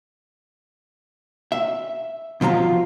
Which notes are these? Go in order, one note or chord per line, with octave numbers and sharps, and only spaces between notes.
E5
B2 F3 F4 A#5